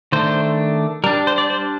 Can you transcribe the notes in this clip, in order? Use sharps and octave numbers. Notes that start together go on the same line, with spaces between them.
D#3 A3 D4 C5
G3 D4 A#4
C5
D5
C5